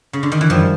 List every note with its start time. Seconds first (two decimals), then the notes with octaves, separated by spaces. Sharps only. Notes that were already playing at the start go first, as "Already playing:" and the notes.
0.13 C#3
0.23 D3
0.32 D#3
0.41 E3
0.50 F#2 D#3 F3 G3